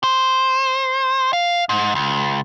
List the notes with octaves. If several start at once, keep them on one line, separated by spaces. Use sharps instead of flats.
C5
F5
G#2
C#2